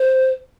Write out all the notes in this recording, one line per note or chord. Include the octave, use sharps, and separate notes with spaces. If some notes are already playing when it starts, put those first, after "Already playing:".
Already playing: C5